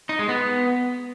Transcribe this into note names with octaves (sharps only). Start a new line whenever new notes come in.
D#4
G#3
B3